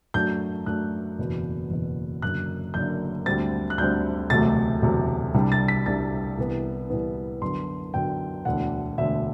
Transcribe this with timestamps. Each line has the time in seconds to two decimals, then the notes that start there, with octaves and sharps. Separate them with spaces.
0.14 F#2 F#3 A3 D4 G6
0.66 F#2 F#3 A3 D4 F#6
1.18 F#1 E2 B2
1.70 F#1 E2 B2
2.22 F#1 F#2 D3 F#6
2.74 F#1 F#2 D3 G6
3.26 D2 D3 G3 C4 A6
3.70 F#6
3.78 D2 D3 G3 C4 G6
4.30 E1 D2 C3 F#3 A3 A6
4.82 E1 D2 C3 F#3 A3
5.34 C2 C3 G3 D4
5.52 A6
5.68 B6
5.86 C2 C3 G3 D4 A6
6.38 C2 C3 E3 B3
6.90 C2 C3 E3 B3
7.42 F#2 D3 F#3 B3 C6
7.94 F#2 D3 F#3 B3 G5
8.45 E1 D2 D3 F#5
8.98 E1 D2 D3 E5